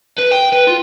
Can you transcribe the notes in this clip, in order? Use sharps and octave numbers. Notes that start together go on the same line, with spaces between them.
B4
G5
B4
F4